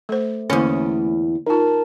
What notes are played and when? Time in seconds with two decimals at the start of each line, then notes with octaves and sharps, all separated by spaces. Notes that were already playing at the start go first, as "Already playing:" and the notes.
0.09 A3 A4 C5
0.50 E2 D3 A#3 C#4 C5
1.46 D#4 F4 A#4 A5